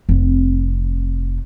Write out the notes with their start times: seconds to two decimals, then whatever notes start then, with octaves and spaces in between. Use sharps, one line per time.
0.09 F1 C4